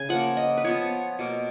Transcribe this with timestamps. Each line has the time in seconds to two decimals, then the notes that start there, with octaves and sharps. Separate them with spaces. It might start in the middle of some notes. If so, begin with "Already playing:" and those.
Already playing: C#3 G#5
0.09 F3 A#3 F#5
0.37 D#5
0.57 B4
0.64 F3 B3 C#5
1.19 B2 A#3